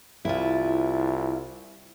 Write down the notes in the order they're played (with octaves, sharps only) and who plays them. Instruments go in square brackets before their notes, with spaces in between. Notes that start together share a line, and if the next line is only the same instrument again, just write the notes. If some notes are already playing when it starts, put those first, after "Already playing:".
[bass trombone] C2 [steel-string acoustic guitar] E4 F4